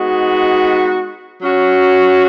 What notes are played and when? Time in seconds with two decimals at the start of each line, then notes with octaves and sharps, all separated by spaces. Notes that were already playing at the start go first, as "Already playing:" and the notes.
Already playing: G#3 B3 D#4 F#4
1.41 F#3 C#4 F#4